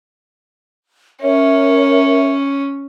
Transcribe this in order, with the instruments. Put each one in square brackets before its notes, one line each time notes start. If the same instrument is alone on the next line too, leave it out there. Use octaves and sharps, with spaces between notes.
[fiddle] C#4 [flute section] A#4 C#5 E5